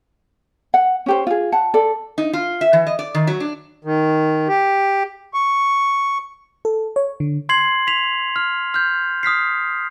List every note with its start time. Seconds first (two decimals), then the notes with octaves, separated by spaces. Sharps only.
0.74 F#5
1.06 C#4 G4 C5
1.27 F4 G#4
1.52 F#5 A5
1.74 A4 D5
2.18 D#4
2.33 F4
2.61 E5
2.73 E3
2.87 D#5
2.99 D5
3.14 D#3
3.27 F#3
3.40 D4
3.85 D#3
4.48 G4
5.34 C#6
6.65 A4
6.96 C#5
7.20 D3
7.49 C6 G#6 C7 F#7
7.87 B6 F7
8.36 F6
8.74 F6 G6
9.23 D#6 F6 B6 C7